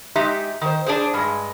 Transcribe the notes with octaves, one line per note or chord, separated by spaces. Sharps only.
G#3 D#4 G4 E5
D#3 C5
D4 G#4 C5
G2 G#3